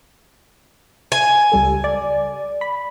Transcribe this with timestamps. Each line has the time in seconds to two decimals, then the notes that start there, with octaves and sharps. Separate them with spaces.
1.12 G#5
1.52 C#2 G3 A4
1.84 D5
2.61 B5